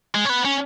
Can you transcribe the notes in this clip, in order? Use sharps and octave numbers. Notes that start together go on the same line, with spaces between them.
G#3
C#4
B3
C#4